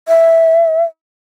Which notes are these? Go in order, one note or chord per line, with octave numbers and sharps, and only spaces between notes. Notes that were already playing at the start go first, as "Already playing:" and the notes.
E5